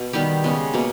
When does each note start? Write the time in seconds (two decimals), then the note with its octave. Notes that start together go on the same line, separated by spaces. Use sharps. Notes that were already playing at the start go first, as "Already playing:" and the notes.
Already playing: B2
0.13 D#3 G3 B3 G4
0.44 C#3 G#3 B3
0.74 B2 A#3